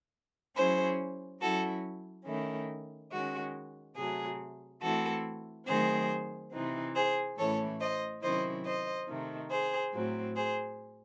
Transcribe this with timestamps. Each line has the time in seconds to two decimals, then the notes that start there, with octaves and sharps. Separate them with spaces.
0.55 F#3 C#4 E4 G#4 C5
1.41 F#3 C#4 E4 F#4 A4
2.26 D#3 A3 C#4 E4
3.12 D#3 G#3 C#4 F#4
3.96 C3 F#3 A3 G#4
4.82 E3 A3 C4 E4 F#4 A4
5.67 D#3 F#3 A3 C4 G#4 C5
6.53 C3 E3 C4 D#4
6.95 G#4 C5
7.38 A2 E3 A3 C#4 E4 A4 C#5
7.80 C5 D#5
8.22 C3 D#3 F#3 C#4 E4 C5 D#5
8.65 C5 D#5
9.08 C3 D#3 A3
9.51 G#4 C5
9.93 A2 F#3 C4
10.36 G#4 C5